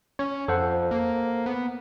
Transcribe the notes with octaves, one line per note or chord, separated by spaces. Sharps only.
C#4 C#5
F2 A4 C5 F#5
A#3
B3